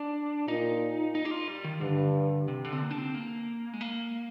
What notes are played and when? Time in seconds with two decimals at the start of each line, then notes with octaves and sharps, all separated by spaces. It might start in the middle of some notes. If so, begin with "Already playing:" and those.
Already playing: D4
0.48 A#2 D#4
1.15 D#4
1.25 G4
1.31 F4
1.48 G3
1.65 D#3
1.81 G2 D3
2.48 C3
2.65 D3
2.73 C4
2.81 A#3
2.91 D4
2.98 C4
3.15 A#3
3.73 G#3
3.81 A#3